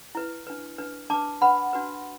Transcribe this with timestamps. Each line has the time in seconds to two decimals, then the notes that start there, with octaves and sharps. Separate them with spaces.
0.15 E4 B4
0.47 D4 B4
0.78 D4 B4
1.10 D4 B4 A5 D6
1.41 D4 B4 F#5 B5
1.73 D4 F#4 B4